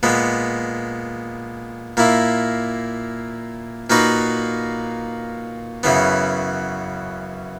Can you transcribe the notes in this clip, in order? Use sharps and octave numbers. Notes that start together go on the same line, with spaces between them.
A#2 G#3 B3
A#2 A#3 E4
A#2 A#3 D#4 F#4 B4
F#2 C#3 E3 B3